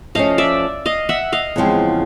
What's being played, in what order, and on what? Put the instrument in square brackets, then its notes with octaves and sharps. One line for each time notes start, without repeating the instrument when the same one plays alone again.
[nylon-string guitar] F3 A3 C#4 [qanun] D#5 F5
[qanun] D5 E5
D#5 F5
E5 F#5
D#5 F5
[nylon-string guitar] E2 C#3 F3 G#3 C4